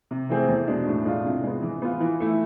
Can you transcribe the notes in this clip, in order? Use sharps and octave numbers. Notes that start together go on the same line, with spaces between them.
C3
E3 A3 C4 G#4
E2
B2 G#3 D4
A2
G#3 D4 F4
C3
G#3 B3
E3
B3 F4
E3
A3 E4